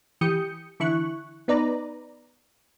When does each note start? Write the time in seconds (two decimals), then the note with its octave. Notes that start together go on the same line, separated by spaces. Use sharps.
0.21 E3 G4 D#6 G6 C#7
0.80 D3 E3 E4 C#6 F#6
1.48 B3 D#4 B4 D5 A#5